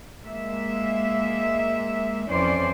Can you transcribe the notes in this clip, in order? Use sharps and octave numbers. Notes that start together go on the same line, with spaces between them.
G#3 A#3 E5
F2 E3 C#4 C5 D5